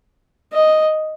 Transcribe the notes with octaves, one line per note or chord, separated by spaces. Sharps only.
D#5